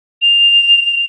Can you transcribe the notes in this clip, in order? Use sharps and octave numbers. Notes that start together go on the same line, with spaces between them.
F7